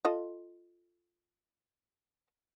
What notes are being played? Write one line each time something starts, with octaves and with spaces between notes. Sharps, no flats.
F4 A4 D#5